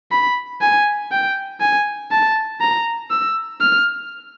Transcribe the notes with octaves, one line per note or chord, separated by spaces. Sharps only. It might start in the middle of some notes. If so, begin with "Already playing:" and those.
B5
G#5
G5
G#5
A5
A#5
E6
F6